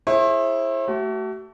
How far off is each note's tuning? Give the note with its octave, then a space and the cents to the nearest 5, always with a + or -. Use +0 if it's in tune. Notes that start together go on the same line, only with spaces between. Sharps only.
E4 +0 G#4 +0 C5 +45
A3 +5 F#4 +40